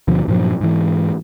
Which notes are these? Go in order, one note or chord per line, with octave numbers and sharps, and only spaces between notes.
D2 B2 F3
G2 A#2 F3 F#3
G#2 E3